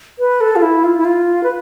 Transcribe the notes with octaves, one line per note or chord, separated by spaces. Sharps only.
B4
A4
F4
E4
F4
E4
F4
B4